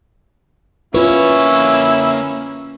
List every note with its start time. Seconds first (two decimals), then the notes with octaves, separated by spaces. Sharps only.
0.94 A#3 C#4 E4 F4 B4 C#5